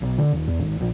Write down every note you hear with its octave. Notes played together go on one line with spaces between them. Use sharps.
B1
D3
D#1
E2
G#1
A#1